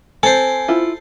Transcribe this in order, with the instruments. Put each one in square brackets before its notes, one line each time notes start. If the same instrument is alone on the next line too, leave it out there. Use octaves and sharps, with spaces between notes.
[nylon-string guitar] C4 [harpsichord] A4 C5 [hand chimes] G#5
[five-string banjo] E4 F4